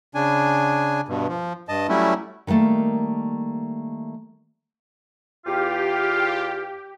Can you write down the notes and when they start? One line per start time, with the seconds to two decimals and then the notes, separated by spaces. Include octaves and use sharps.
0.15 C#3 D4 G#5
1.08 G2 B2
1.29 F3
1.69 G2 D#5 A5
1.89 F#3 G3 A3 C#4 E4
2.47 D#3 E3 G3 A3 A#3
5.46 E2 F4 G4 F5